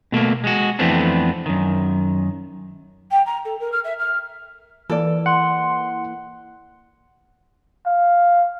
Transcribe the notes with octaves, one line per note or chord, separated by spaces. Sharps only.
B2 A3 A#3
G#3 F#4
F2 E3 A3 B3 C4 D4
F#2 D#3
G5
A#5
A4
A#4
F6
E5
F6
E3 A#3 A4 D5
F#5 C6
F5